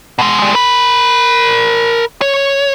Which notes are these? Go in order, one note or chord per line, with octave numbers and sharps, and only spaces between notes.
B2 G#3
G3 G#3
A#4 B5
C#5